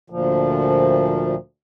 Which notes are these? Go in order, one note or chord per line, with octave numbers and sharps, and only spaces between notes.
D2 A#2 F3